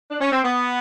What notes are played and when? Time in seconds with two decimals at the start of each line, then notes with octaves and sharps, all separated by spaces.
0.10 D4
0.21 C#4
0.32 C4
0.44 B3